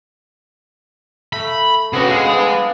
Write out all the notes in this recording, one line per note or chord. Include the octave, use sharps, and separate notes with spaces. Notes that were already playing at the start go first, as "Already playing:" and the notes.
A3 B5
C#3 B3 C4 D4 F#4
G#3 F5
B3 D4